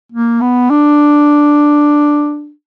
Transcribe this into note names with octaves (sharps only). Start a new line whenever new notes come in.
A#3
B3
D4